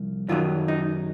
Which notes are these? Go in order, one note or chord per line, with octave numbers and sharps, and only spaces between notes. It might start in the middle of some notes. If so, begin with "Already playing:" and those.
Already playing: C2 F3
F#2 D#3 F#3 F4
D#4